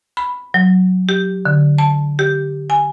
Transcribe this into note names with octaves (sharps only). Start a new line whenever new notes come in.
B5
F#3
G4
D3
A5
G4
G#5